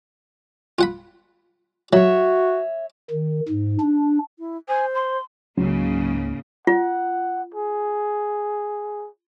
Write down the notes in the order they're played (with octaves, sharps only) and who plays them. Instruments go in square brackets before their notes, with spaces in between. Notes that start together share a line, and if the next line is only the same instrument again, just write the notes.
[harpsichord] F4 F#5 B5
[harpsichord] F#3 [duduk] F#4 [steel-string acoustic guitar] C#5 E5
[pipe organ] D#3
G#2
D4
[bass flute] E4
[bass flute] C5 [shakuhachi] G#5
[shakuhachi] C6
[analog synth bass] C#2 [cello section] G#2 C#3 A#3 [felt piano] F#3
[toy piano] F4 [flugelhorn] F#5
[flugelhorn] G#4